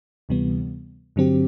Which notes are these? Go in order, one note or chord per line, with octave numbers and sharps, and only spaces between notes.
D2 C3 E3 G3 B3
G2 D3 F#3 C4 G4